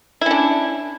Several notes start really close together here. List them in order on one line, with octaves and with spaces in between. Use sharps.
E4 C#4 D4